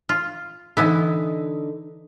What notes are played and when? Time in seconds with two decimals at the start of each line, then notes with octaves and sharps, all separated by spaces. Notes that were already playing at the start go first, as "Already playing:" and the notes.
0.09 F4
0.77 D3 E3 B3 D#4 E4